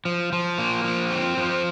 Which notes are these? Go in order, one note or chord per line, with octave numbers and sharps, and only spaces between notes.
F3
F3
A#3
F3
C4
F3